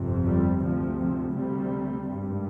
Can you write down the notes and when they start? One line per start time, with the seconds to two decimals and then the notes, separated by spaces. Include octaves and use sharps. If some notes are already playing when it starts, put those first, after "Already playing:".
Already playing: G1 F2 C3
0.26 G3
0.62 D2 C3 F3
0.99 F3
1.35 D2 C3 G3
2.07 G#1 G2